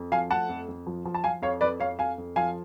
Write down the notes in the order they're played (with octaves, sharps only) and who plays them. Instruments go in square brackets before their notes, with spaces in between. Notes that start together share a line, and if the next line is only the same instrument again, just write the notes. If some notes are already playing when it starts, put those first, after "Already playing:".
Already playing: [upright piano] F2
F3 F5 G#5
A3 F#5 A5
F2
F2
F3
F3
A5
F3 F5 G#5
F2 C#5 F5
F2 B4 D5
F2 C#5 F5
F2 F5 G#5
F2
F3 F5 G#5